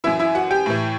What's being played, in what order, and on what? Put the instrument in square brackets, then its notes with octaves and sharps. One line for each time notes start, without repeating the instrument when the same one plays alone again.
[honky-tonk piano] F#2 E3 E4 E5
E4 E5
F#4 F#5
G4 G5
A2 E3